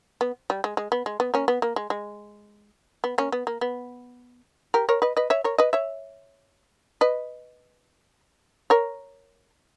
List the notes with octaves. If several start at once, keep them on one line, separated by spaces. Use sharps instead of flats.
B3
G3
G#3
G#3
B3
G#3
B3
A#3 C#4
B3
A#3
G#3
G#3
B3
A#3 C#4
B3
A#3
B3
G4 A#4
A#4 C#5
B4 D#5
B4 D#5
C#5 E5
A#4 C#5
B4 D#5
C#5 E5
B4 D#5
A#4 C#5